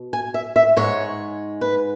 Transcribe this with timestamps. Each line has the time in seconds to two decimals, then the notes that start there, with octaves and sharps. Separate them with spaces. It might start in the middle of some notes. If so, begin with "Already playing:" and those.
Already playing: B2
0.13 G#5
0.34 E5
0.56 E5
0.77 G#2 G#3 C#5
1.61 B4